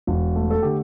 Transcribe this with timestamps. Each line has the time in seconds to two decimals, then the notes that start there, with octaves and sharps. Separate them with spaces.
0.07 E1
0.36 A3
0.51 A4
0.62 D3 G4